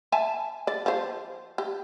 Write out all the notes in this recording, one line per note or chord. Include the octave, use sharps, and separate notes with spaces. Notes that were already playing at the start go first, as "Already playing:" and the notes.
E5 G#5 A5
D5
F3 C5
G4